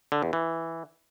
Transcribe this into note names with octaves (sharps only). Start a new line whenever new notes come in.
D3
E2
E3